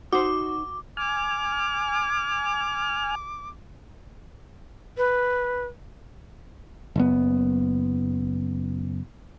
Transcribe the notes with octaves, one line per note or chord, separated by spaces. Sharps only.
D#4 F#4 C5 D6
G#5 D6 F6
B4
F#1 B3